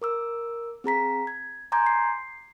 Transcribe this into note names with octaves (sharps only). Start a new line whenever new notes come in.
A#4 D6 E6
C4 G#4 A#5 B6
G#6
G#5 A#5 C6 D6 G6 G#6
C7